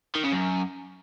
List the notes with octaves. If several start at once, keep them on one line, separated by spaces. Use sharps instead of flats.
D#3
C#3
F#2